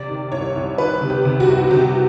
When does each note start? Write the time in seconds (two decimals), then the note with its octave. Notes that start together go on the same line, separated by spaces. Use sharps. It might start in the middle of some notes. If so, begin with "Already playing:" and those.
Already playing: C3 D5
0.09 D#3
0.32 C2 C#5
0.56 C2
0.78 D#3 B4
1.01 C3
1.10 G4
1.25 C3
1.40 F#4
1.48 C2
1.64 F#4
1.71 C3 G4